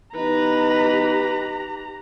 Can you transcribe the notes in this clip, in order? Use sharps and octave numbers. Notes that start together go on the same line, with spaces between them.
E3 B3 D#4 G4 B4 A#5